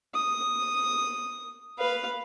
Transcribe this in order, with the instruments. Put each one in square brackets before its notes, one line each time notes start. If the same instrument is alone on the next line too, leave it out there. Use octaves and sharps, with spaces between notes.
[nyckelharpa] D#6
B4 F5